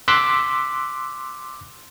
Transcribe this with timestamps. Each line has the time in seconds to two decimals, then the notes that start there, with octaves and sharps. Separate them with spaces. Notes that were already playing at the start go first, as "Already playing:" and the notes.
0.08 C6 D6 E6 F#6 B6